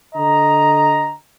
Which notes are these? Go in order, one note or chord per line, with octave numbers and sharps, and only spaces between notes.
D3 D#5 A#5